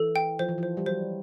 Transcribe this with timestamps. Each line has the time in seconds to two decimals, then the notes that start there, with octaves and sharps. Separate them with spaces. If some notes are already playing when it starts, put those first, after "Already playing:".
Already playing: E3 A4
0.16 G5
0.39 F3 C5
0.48 E3
0.58 F3 C5
0.77 G3
0.86 F#3 C5